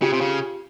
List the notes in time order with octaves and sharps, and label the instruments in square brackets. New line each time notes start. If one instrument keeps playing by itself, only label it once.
[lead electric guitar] C#3 [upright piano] F4 G4
[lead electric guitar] C3
C#3